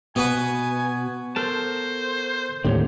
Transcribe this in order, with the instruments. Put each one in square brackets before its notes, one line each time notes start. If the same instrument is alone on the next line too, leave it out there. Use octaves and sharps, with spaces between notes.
[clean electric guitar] B2 [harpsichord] B3 F#4 B4 [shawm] G#5
[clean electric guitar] A4 A#4 A5 [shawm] C5
[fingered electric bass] D#2 A2 D3 [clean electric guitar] C4 G4 C#5